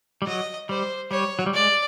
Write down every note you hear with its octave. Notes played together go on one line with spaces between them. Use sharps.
G3
F#3 D#5
G3 C5
G3 C#5
F#3
G3
G#3 D5